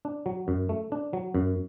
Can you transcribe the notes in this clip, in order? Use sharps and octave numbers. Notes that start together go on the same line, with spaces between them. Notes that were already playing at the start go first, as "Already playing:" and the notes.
D4
F#3
F#2
A3
D4
F#3
F#2